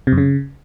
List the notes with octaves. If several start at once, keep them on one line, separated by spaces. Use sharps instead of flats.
C3
F#2
C#3